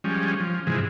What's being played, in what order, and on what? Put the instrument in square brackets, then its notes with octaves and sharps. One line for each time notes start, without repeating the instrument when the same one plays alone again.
[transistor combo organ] F3 G3 G#3 C#4
F3
G#2 C3 E3 F3 G#3